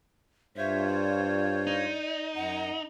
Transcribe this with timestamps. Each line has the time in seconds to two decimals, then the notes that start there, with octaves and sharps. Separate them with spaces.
0.57 G2 F4 C5 C#5 E5
0.87 D5
1.67 D#4
2.36 F#2 F#5 A#5